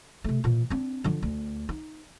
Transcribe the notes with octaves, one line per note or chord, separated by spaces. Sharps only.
C3 A3
A#2 E3
C4 D4
D3 F3
D2
D#4